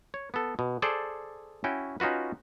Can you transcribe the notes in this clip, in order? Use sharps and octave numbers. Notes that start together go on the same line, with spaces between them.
C#5
B3 A4
B2
G#4 A4 C5 D5
C#4 E4 F#4 G5
C#4 D#4 F4 F#4 B4